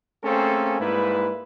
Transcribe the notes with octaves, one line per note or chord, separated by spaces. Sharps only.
A3 A#3 C4 C#4 G#4 A4
G#2 G3 A#3 E4 B4